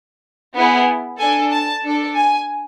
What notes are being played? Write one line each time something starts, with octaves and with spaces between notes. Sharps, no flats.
B3 E4 G#4
D4 A4 G#5
A5
D4 A4
G#5